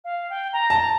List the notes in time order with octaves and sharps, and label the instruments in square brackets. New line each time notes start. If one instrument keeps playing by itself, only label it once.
[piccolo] F5
G5
A#5
[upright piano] A5